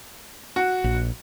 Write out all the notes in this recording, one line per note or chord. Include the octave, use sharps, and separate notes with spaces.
F#4
A#1